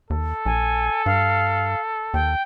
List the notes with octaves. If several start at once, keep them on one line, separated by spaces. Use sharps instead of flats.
D#2 A4
A#1 G#5
G2 F5
D#2 G5